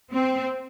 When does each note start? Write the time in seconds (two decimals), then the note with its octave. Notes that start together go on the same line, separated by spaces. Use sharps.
0.13 C4